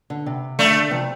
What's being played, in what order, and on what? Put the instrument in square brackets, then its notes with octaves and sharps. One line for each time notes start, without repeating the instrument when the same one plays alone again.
[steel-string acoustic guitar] D3
C3
[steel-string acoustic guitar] D3 [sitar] A3
[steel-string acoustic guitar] C3 F3